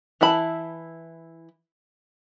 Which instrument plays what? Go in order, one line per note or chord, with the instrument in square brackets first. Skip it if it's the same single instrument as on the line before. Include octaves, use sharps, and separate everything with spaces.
[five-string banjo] E3 E4 A5 B5